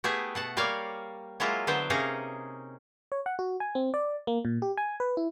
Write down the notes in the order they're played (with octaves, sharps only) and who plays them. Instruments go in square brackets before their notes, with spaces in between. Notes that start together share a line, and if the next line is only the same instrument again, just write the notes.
[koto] A3 B3 E4 G4 G#4
B2 F#5 A5
G3 A#3 C#5 D5 F5
F#3 G#3 A#3 E4 F4
D3 F#3 B3 C5 G5
C3 A#3 C#4 D#4 G#4 A#5
[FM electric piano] C#5
F#5
F#4
G#5
C4
D5
A#3
A#2
G4
G#5
B4
E4